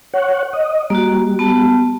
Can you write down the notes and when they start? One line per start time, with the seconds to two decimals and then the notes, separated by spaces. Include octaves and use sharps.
0.14 C#5 F#5
0.53 D#5
0.90 G3 A#3 F#4
1.39 B3 A5